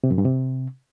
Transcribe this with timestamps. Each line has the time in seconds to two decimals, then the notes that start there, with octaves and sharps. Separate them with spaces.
0.04 C3
0.11 F#2
0.18 G2
0.25 C3